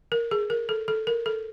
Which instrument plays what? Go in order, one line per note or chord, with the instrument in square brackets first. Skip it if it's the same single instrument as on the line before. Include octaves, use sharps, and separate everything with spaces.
[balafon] A#4
G#4
A#4
A4
A4
A#4
A4